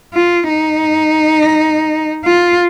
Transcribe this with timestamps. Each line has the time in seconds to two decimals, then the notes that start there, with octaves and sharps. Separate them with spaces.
0.14 F4
0.49 D#4
2.25 F4